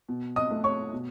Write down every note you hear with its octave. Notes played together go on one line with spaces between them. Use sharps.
B2
D#5 D#6
A3
C#5 C#6
B2